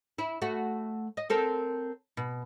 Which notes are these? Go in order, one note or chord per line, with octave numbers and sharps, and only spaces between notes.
E4
A3 F#4
D#5
C4 A4 A#4
B2